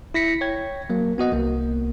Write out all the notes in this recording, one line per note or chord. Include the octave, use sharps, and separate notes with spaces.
E4 A#6 B6 C#7
C#5 G5 G#6
F#3 A#3
B3 F#4 D#5 F#5
C2 A#3